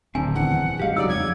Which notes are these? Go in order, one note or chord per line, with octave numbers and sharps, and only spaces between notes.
D1 D3 D#3 C4 G#5
D#1 E2 F#5
F#2 G#3 G4 F5
C#3 F#3 G#3 D#4 D5 E6
F2 G#6